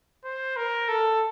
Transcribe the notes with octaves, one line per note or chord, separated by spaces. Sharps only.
C5
A#4
A4